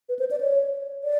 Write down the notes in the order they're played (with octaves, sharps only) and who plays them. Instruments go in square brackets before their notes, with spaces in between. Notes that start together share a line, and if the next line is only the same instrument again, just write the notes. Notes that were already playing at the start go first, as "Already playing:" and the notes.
[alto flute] B4
C5
D5
C#5
D5